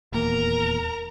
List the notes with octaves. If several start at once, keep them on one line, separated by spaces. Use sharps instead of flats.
D#1 E2 A#3 A#4 A#5